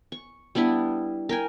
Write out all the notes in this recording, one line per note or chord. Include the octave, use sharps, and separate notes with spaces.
C#6
G3 B3 D4 E4
A#4 G5 G#5